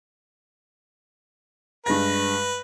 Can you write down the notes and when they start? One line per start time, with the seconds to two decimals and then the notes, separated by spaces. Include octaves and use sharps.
1.86 G2 G#3 B4 A#6